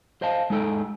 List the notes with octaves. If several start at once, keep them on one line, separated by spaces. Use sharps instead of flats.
C5 D#5 F5 A5
G#3 D#4 A4 D#5 G5